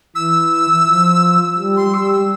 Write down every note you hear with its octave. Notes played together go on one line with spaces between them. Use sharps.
E3 E6
F3
G3
C6
G3 E6
E6